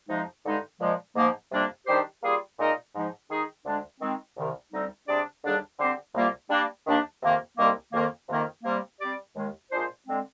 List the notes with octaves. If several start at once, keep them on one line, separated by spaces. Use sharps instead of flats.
F2 C3 F3 G#3 D#4
G2 D3 G#3 D#4
A#2 F3 G#3
G#2 F3 A#3
F2 C3 G3 A#3 D4
D#3 G3 D4 G4 C5
G3 A#3 F4 G#4
A#2 G#3 D#4 A#4 D#5
G#2 F3 G#3 D#4
D#3 G#3 D#4 G#4
D2 D3 G#3 D4
D#3 G#3 C4
C2 C3 D#3
D2 D3 G3 C4 D#4
C3 G3 D4 G#4 D5
D#2 D3 G3 D4 G#4
D3 G3 C4 G4 C5
C2 C3 G3 A#3 F4
G3 A#3 D4
D#2 D#3 A#3 D4 G4
F2 C3 D#3 A#3
C2 C3 D#3 G3 A#3
F2 D#3 A#3
F2 C3 D#3 A#3 D#4
C3 G3 A#3
G3 C4 G4 D5
D#2 D#3 G#3
A#2 G#3 D4 F4 C5
D3 G#3 C4